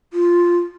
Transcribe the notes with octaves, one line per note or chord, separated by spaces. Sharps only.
F4